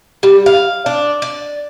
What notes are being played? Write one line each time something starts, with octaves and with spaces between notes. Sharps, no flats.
G3
F5
D4
D5